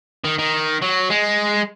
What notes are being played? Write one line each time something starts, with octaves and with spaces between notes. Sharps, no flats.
D#3
D#3
F#3
G#3